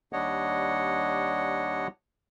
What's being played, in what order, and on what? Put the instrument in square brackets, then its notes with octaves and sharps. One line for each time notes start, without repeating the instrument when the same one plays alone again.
[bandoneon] D#2 G3 D4 C#5 D#5 F#5